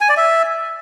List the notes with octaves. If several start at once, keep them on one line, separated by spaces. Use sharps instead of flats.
G#5
D5
E5